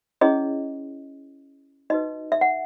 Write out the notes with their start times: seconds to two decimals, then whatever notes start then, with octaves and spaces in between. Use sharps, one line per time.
0.21 C#4 E4 G#4 C#5 D#5
1.90 D#4 F#4 B4 D#5
2.32 E5
2.41 F#5